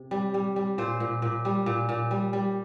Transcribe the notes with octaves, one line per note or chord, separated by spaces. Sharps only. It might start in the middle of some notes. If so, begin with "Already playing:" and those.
Already playing: C3
G3
G3
G3
A#2 C5
A#2
A#2
G3
A#2
A#2
G3
G3